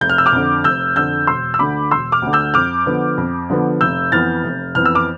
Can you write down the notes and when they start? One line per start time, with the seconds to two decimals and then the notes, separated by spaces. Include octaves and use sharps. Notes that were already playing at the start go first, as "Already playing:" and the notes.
0.01 F1 G6
0.09 F6
0.18 E6
0.26 D6 F6
0.32 F2 D3
0.64 F1 E6 G6
0.96 F2 D3 E6 G6
1.27 E1 C6 E6
1.54 E6
1.59 D2 D3 B5 D6
1.91 E1 C6 E6
2.12 D6 F6
2.22 D2 D3
2.33 E6 G6
2.54 F2 D6 F6
2.86 D3 F3 B3
3.17 F2
3.50 D3 F3 B3
3.81 F1 E6 G6
4.12 F2 E3 B3 F6 A6
4.44 F1
4.75 F2 E3 B3 F6
4.86 E6
4.95 D6 F6